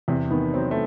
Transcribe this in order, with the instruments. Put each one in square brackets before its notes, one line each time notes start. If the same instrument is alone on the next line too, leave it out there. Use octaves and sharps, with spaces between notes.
[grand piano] E2 [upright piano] C3
[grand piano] D#3 [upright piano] B3
[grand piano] F#3 [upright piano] C4
[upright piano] A3